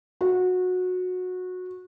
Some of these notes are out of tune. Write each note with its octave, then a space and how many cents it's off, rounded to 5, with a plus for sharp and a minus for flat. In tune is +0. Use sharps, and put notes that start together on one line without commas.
F#4 -20